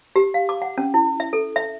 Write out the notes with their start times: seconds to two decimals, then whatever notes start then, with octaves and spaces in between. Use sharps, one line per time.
0.16 G4
0.34 F5
0.49 D6
0.62 F#5
0.78 C#4
0.94 E4
1.20 E5
1.33 A4
1.56 E5